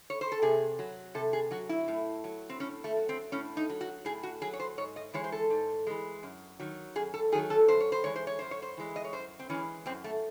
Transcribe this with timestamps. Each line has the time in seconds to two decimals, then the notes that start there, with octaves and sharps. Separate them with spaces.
0.10 C#5
0.21 C5
0.32 A4
0.42 C3 G#4
0.79 F#3
1.15 C3 A4
1.33 G#4
1.51 F#3 F#4
1.69 E4
1.88 A2
2.24 F#3
2.49 C4
2.60 A2 C#4
2.84 A3
2.97 F#3
3.09 C4
3.32 A2 C#4
3.57 D#4
3.69 F#3
3.81 F#4
4.05 A2 G#4
4.23 F#4
4.42 F#3 G#4
4.53 C#5
4.60 C5
4.78 G#2 C#5
4.96 D#5
5.14 E3 G#3 C#5
5.24 C5
5.32 A4
5.50 G#2
5.87 E3 G#3
6.23 F#2
6.60 D#3 F#3
6.95 F#2 G#4
7.14 A4
7.32 D#3 G#4
7.35 F#3
7.50 A4
7.68 F#2 C5
7.80 C#5
7.92 C5
8.04 E3 G#3 C#5
8.16 C5
8.27 C#5
8.39 F#2 C5
8.51 C#5
8.62 C5
8.77 E3 G#3
8.96 D#5
9.04 C#5
9.13 F#2 C5
9.39 C4
9.50 E3 G#3 C#4
9.86 F#2 C4
10.04 A3